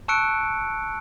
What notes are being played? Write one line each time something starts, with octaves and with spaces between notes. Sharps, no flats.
A5 C#6 E6 F#6 C#7 D7